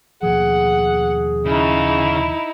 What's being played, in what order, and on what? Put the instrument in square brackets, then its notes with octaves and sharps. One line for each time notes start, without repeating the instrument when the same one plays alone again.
[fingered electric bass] D#2 B2 F3 [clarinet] G#4 [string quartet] F#5
[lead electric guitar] C#3 [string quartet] D#4 E4